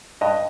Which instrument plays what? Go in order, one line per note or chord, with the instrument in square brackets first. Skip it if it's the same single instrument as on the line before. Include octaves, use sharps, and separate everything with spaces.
[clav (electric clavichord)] G2 [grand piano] D#5